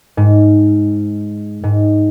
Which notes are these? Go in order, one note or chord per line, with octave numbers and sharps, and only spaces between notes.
G#2
G#2